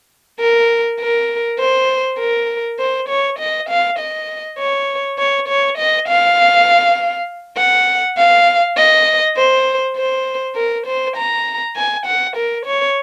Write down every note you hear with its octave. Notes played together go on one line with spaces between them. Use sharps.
A#4
A#4
C5
A#4
C5
C#5
D#5
F5
D#5
C#5
C#5
C#5
D#5
F5
F#5
F5
D#5
C5
C5
A#4
C5
A#5
G#5
F#5
A#4
C#5